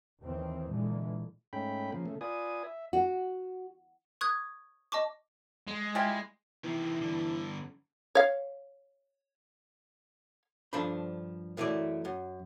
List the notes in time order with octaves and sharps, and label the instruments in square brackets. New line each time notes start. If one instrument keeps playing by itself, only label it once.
[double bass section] D#2 D#3 E3 C4
A#2 D3 E3 G#3
[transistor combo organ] G#2 A3 C#4 G5 B5
C#3 F3 A#3
C#3 A3
F4 B4 D5 G#5 D#6
E5
[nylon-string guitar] F#4
[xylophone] C#6 D#6 F#6 G#6
D#5 A5 C#6 D6
[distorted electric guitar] G#3
[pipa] G3 F4 G4 [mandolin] E4 G#5
[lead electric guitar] C3 D#3 [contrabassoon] E3
[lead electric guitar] G2 D3
[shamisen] C#5 F5
[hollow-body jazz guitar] G2 F3 D4 A4 C5 B5
F#2 E3 A3 E4 D5
F#2